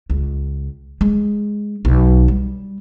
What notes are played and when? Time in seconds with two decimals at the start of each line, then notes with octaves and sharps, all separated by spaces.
0.10 C#2
1.01 G#3
1.85 B1
2.28 G3